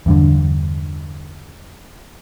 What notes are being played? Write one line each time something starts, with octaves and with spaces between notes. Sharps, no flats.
E2 G2 D3